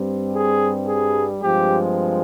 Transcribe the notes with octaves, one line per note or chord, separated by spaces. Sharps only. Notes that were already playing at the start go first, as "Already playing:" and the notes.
Already playing: G2 G3 C4
G#4
G#4
G2 F3 G#3 C4 G4